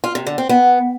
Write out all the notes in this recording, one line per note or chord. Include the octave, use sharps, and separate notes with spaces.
F4
C3
D3
C4
B3